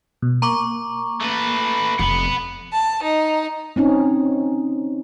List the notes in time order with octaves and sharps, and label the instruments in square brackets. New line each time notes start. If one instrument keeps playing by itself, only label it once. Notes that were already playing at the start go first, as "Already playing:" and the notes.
[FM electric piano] B2
[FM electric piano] A#3 [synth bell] A#5 C#6 D6
[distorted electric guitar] A3 B4
[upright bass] F1 [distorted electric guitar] F#5 B5
[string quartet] A5
D#4
[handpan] C4 C#4 D#4